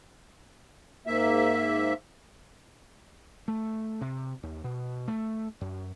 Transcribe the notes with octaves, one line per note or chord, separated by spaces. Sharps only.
G#2 A#3 E5
A3
C3
D#2
B2
A3
F#2